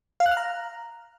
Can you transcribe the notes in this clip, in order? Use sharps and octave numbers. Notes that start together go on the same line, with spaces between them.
F5
F#6
F6
A#5